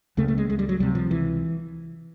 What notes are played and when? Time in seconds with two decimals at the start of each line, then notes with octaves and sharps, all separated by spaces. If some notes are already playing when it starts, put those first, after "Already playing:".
0.17 C#2 C#3 A3
0.28 A3
0.38 G#3
0.50 G#3
0.59 G3
0.69 F#3
0.80 C#2 C3 G3
0.95 F3
1.11 E3